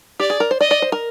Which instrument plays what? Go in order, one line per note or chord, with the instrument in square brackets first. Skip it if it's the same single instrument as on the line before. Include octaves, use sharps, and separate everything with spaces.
[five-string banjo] G4 [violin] D5
[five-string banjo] G#4
A#4
C5
[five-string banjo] D5 [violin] D#5
[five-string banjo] D5
C5
A#4